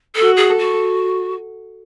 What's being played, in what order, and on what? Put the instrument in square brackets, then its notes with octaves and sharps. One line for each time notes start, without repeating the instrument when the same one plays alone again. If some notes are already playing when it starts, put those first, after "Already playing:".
[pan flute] A4
[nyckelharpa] F#4
[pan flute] G#4
[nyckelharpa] A4
[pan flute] F#4